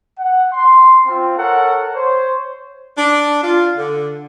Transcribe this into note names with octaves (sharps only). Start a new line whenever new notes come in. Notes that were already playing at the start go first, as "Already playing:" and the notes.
F#5
C6
C4 F4
A4 A#4 C#5 F#5
C5 C#5
D4
F4
D3